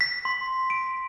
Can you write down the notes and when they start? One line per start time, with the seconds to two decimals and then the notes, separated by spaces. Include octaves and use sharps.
0.01 B6
0.25 C6
0.70 D7